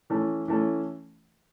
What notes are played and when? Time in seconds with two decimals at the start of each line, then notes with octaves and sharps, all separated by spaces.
0.10 E3 A3 C#4
0.48 E3 A3 C#4